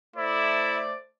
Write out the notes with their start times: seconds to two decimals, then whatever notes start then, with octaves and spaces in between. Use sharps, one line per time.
0.16 A3 E4 C5 D5